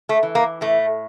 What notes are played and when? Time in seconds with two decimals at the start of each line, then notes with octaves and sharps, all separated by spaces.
0.09 A3
0.23 E3
0.35 A#3
0.61 A2 A3